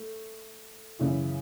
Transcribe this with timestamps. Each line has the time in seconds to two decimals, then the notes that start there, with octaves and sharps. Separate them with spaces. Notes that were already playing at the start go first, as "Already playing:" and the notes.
Already playing: A3
0.99 F#2 C#3 E3